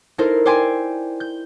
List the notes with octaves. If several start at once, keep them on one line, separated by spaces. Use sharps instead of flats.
D#4 E4 A4 A#4 C5
C5 D5 G5 G#5 C6
G6